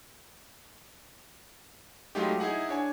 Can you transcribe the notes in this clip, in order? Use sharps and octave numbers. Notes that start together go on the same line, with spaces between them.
F#3 G#3 A3 D#4 F4 G4
D#4 E4 G#4 F#5
D4 C#5 G#5